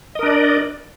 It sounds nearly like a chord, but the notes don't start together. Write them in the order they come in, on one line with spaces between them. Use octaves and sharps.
D#5 A#4 D4 D5